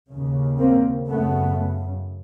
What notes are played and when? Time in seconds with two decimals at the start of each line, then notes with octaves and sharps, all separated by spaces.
0.10 D#2 C#3
0.59 A#3 C4
1.07 F#2 C#3 A3 B3